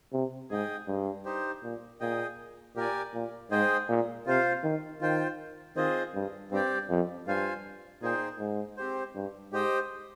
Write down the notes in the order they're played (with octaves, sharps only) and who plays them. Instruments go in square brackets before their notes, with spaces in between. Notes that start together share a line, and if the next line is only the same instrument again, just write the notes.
[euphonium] C3
[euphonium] G#2 [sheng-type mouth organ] G#4 D#5 G5
[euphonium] G2
[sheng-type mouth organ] D#4 G4 C5
[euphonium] A#2
[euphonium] A#2 [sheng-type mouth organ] G#4 D#5 G5
[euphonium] A#2 [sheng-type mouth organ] G4 A#4 D5 G#5
[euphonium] A#2
[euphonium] G#2 [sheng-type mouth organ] G#4 C5 D#5 G5
[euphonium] A#2
[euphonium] C3 [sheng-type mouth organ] F4 C5 F5
[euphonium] D#3
[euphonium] D#3 [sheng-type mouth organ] F4 C5 G5
[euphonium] D#3 [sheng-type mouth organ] C4 F4 G#4 C5 D#5
[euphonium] G2
[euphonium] G2 [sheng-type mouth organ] C4 G4 D5 G5
[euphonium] F2
[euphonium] G2 [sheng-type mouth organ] F4 C5 F5 G#5
[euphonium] A#2 [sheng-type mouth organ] D#4 G#4 C5 G5
[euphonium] G#2
[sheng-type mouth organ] C4 G4 C5
[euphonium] G2
[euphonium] G#2 [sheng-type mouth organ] G4 C5 D#5 G5